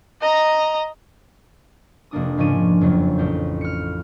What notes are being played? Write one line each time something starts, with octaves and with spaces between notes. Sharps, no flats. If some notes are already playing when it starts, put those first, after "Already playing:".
D#5 A#5
F1 A#3 D4 D#6
G#2 C#3 F3 C#4 D4 D#7
F#1 F2 F#3
A1 G6
F6 C#7